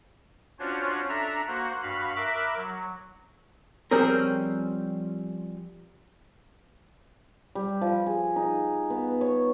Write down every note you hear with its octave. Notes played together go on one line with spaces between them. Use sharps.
C#4 D4 F4 F#4 C5 C#5
D4 A4 E5 A#5
A#3 F#4 C5 F#5
G2 F#4 F5 B5
A#4 E5 B5 D6 F#6
F#3
F3 G3 C4 C#4 G#4 A#4
G3
F3
G#4
D#4
B3
C#5